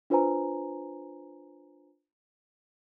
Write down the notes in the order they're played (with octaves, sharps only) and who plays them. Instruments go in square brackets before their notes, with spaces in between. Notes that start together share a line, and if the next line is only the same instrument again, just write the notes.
[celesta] D4 F4 B4 C5 G#5 A#5